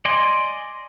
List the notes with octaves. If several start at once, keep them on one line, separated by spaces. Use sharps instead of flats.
D5 D#5 G#5 C6